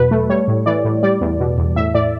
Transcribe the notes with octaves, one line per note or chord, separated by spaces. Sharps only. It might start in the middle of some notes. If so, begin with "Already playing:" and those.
Already playing: E2 B2 F#3 B4
A3
G3 C#5
A2
E3 D5
A2
G3 D5
E2
B2
E2
A2 E5
A2 D5